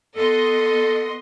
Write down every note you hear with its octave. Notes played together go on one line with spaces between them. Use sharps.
B3 A4 D#5 C6